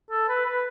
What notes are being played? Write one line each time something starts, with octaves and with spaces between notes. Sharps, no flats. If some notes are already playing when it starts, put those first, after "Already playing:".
A4
B4
B4